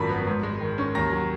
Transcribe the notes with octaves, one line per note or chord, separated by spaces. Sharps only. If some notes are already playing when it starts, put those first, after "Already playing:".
Already playing: G#1 F#2 F3 B5 B6
B3
G#2
G#3
D#3
C#4
D#2 A#5 A#6
F#3